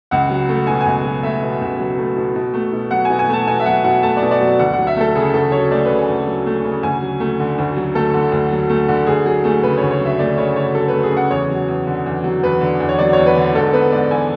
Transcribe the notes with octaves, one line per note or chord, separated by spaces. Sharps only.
C#2 F#5
F#3
A3
B2 G#5
G#5
C#2
F#3
A3 E5
B2
C#2
F#3
A3
B2
B2
A3
B2
F#3 F#5
B2 G#5
G#5
A3 A5
B2 G#5
E5
F#3 F#5
B2 F#5
A3 A5
D5
B2
D5
F#3
D2 F#5
F#3 F#5
E5
A3 A4
C#3 G#4
D2 A4
F#3 C#5
A3 D5
C#3 B4
G#5
D2
F#3
A3
C#3
D2 G#5
F#3
A3
D3
D2
F#3
A3 A4
D3
D2
F#3
A3
D3
D2 G#4
F#3 G#4
A3 G#4
C#3 B4
C#5
D2
C#5
F#3
E5
A3 D5
C#3 C#5
D2 C#5
F#3 A4
A3 B4
G#4
C#3 F#5
E2 C#5
F#3
E2
D3
E2
F#3
E2 B4
D3
E2
C#5
F#3 D5
E2 C#5
B4
D3
G#2 A4
B3 B4
G#2 D5
E3 G#5